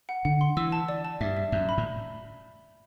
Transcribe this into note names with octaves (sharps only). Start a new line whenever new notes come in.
F#5
D3 F#5
C6
E3 E6
A5
D5
A5
G2 E5
E5
F#2 E5
B5
A2